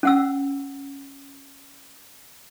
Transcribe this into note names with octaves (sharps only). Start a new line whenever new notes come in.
C#4 F#5 E6